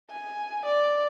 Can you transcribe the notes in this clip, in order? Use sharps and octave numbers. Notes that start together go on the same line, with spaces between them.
G#5
D5